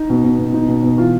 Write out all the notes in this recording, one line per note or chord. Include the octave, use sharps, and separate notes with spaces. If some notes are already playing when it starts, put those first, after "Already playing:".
Already playing: D#4
B2
B2
B2
B2 D#4
B2
B2
E3 F4